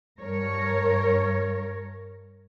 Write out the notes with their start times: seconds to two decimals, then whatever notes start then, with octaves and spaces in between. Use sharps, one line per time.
0.20 G2 A#4 C#5